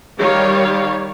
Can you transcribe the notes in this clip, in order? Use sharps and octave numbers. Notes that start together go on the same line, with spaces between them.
D#3 G3 C#5 F5